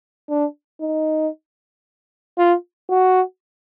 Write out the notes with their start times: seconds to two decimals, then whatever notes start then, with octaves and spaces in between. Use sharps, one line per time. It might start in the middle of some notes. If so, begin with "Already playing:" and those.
0.29 D4
0.81 D#4
2.38 F4
2.90 F#4